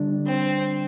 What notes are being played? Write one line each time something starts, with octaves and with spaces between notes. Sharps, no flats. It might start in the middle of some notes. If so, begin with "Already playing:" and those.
Already playing: D3 G3 D4
C4